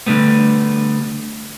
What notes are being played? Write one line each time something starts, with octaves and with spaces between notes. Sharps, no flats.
D3 G3 A3 B3